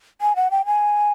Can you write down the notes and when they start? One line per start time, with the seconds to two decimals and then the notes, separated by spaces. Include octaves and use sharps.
0.21 G#5
0.36 F#5
0.51 G5
0.66 G#5